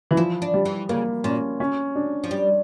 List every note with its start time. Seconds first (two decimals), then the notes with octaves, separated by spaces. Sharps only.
0.11 E3
0.17 F3 E4
0.42 D4
0.54 G3
0.65 E3
0.89 C#3 A#3
1.24 A#2 C#4
1.60 C#4
1.95 D4
2.24 F3
2.31 G3